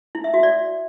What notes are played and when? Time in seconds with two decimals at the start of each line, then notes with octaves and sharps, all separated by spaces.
0.15 E4
0.24 E5
0.34 F#4
0.43 D5